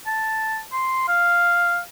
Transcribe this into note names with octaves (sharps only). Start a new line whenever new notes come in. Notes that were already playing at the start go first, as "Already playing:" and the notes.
A5
C6
F5